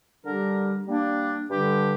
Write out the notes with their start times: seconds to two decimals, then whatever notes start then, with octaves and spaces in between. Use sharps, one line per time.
0.25 D3 G3 D4 G4 A#4
0.87 G3 A#3 D4
1.50 G2 D3 G3 D4 G4